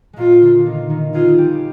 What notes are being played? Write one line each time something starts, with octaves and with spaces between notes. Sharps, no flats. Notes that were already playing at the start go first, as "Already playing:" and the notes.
A#2 G#3 A#3 F4
D3 D4
D#3 D#4
D#3 D#4
G#3 F4 G#4
G#4
G3 G4